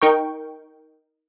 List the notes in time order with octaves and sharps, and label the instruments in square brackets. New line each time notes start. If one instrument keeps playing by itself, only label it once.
[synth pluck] D#4 A#4 G5 C#6